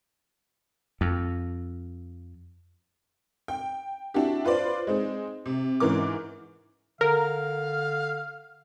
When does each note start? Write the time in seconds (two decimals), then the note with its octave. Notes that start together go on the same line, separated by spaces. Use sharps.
1.01 F2
3.48 G5
4.14 D4 E4 F#4 G4
4.45 F4 B4 C5 D5
4.87 G#3 C4 D#4
5.46 C3
5.80 G#2 E3 C#4 A#4 D6
7.01 D3 A#4 F5